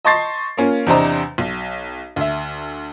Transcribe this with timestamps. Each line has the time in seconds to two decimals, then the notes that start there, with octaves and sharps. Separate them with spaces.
0.05 D#5 A5 C6 C#6 A6 C7
0.57 A#3 C#4 F4
0.87 E2 C3 D4 C5 D#5 A#5
1.38 B1
2.16 D2 E5